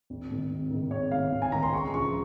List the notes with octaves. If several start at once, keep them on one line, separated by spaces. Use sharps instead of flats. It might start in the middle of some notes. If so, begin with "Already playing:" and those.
G#1
G#2 D#3
G#1
G#2 D#3
G#1 C#5
G#2 D#3 F5
G#1
G#5
G#2 D#3 A#5
C6
C#2 C#6
C#3 F3 C#6